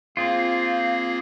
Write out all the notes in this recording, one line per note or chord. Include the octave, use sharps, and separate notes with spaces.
A#3 C4 F4 G#4